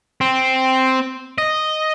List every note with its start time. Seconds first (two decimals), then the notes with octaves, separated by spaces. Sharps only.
0.21 C4
1.38 D#5